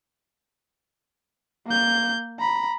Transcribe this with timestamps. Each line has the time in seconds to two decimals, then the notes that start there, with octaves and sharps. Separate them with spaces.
1.67 A#3 G6
2.39 A#5 B5